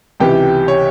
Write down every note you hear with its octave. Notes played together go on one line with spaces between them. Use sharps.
C#2 C3 E3 G4 G5
C#5